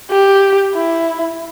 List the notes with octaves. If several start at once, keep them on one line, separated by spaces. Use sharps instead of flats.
G4
E4